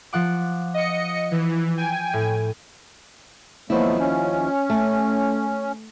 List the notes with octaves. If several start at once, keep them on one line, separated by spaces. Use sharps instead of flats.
F3 F#5 D6
D#5 C#7
E3
G5 G#5
A2
D#2 F3 F#3 A3 B3 E4
C#4
A3